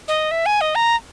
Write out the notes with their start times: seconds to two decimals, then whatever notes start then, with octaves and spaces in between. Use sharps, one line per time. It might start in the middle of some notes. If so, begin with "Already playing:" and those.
0.08 D#5
0.31 E5
0.46 G#5
0.61 D#5
0.75 A#5